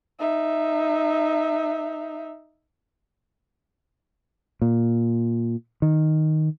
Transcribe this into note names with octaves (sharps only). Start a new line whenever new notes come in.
D#4 E5
A#2
D#3